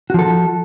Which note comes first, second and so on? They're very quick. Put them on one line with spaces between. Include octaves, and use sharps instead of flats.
F#4 F3 A4